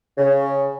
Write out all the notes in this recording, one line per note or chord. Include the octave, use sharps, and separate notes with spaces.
C#3